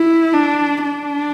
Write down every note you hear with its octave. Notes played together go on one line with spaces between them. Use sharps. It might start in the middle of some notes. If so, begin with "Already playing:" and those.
Already playing: E4
D4
D4